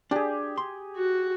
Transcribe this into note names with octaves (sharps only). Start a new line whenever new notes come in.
D4 G4 G#4
C6
F#4